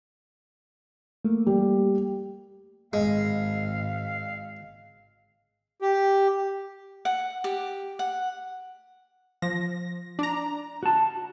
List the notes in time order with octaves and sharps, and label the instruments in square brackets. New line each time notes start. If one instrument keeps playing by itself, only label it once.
[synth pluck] A3 A#3
[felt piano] G3
[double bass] G#1 [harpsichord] G#3 [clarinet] F5
[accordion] G4
[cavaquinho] F#5
G4
F#5
[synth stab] F3 A#6
D4 A#5
[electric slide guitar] F#4 A5